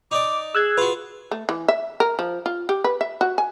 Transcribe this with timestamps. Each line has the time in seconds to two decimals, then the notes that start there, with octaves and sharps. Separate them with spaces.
0.11 D#4 D5 D6
0.55 G#4 E6 F#6 G#6
0.78 F4 F#4 B4
1.31 A3
1.49 E3
1.68 E5
2.00 A#4
2.19 F3
2.46 F4
2.69 G4
2.84 B4
3.01 E5
3.21 F#4
3.38 G#5